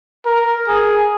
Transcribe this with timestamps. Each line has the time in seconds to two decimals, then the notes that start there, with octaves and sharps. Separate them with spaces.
0.26 A#4
0.68 G#4